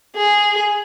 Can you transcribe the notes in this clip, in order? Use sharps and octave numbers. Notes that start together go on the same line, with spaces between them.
G#4